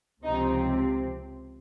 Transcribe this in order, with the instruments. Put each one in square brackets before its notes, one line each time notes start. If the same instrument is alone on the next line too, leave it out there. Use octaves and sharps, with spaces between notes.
[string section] C#2 C3 F3 C4 D#4